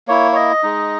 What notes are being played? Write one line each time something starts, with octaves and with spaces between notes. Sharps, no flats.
A#3 E4 C#5
C#5
D#5
G#3 D#4